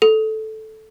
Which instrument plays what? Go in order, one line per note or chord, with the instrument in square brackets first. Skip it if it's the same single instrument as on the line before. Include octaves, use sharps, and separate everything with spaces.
[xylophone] A4